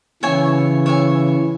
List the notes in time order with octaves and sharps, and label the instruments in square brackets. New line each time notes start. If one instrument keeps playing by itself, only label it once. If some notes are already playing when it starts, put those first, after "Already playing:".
[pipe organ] C#3 E3 [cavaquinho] C#5 E5 G#5
[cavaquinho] C#5 E5 G#5